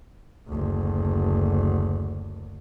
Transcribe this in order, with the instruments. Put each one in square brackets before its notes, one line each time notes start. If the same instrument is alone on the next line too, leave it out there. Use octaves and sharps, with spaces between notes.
[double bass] F#1 D2